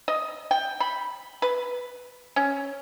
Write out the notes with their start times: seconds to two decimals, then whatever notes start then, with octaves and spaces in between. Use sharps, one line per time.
0.08 D#5
0.51 G5
0.80 B5
1.42 B4
2.36 C#4